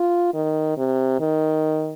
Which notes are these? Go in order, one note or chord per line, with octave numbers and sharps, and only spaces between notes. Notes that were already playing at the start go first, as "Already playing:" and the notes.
Already playing: F4
D#3
C3
D#3